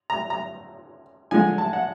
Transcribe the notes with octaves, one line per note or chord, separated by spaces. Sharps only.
A#5
A#5
D3 F3 G#3 G#5
A5
F#5